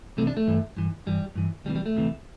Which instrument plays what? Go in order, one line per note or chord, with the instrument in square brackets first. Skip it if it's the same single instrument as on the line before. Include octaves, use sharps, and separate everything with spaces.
[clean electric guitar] C2 C3 E3 A3
D4
A3
G2 E3
G2 E3
G2 E3 G3
G2 E3
D2 C3 E3 G3
G3
A3
D2 C3 E3